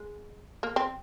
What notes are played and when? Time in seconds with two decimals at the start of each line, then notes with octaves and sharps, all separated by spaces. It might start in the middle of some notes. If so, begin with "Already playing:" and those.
Already playing: G#3
0.63 A#3
0.76 C4